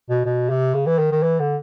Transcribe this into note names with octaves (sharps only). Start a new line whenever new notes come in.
B2
B2
C3
C#3
E3
D#3
D#3
E3
D3